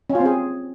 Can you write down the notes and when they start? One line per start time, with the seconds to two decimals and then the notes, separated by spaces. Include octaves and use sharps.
0.10 C#4
0.15 F4
0.20 C4
0.25 G#4